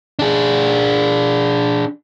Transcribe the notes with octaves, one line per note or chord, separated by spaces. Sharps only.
D4 G#4